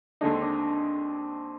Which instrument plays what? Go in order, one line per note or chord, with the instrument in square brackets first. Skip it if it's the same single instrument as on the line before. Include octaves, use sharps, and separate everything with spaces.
[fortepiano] D#2 D3 G#3 D#4 [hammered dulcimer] D4
[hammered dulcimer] C4
D4